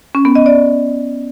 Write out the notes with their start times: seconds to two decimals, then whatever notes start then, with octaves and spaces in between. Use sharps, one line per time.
0.15 C#4
0.25 B3
0.35 D#5
0.46 D5